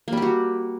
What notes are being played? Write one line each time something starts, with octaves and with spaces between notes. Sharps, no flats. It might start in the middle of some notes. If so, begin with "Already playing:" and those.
G3 A#3 F#4 G4